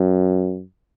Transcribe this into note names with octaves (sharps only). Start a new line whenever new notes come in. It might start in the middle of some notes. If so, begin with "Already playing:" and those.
Already playing: F#2